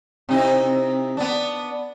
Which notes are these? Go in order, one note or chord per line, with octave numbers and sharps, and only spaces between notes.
C3 D#4 E4
B3 D4